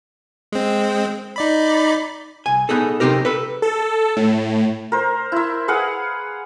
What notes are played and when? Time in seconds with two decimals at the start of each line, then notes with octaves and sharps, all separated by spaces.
0.52 G#3 C4
1.36 D#4 D5 B5
2.46 C2 G#5
2.69 B3 D#4 G#4 A4
3.00 C3 C4 D#4 G4 A#4
3.25 A4 B4
3.62 A4
4.17 A2
4.92 A#4 C5
5.32 E4 E5
5.68 G#4 B4 F5 F#5